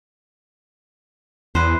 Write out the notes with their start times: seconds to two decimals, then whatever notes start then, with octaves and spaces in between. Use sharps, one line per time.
1.55 E2 B4 C5